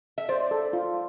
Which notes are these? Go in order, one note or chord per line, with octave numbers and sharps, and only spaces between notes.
E5
C5 D5
A4
F4